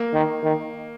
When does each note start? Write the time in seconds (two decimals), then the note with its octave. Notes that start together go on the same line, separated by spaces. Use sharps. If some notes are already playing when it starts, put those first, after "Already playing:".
Already playing: A#3
0.14 D#3
0.44 D#3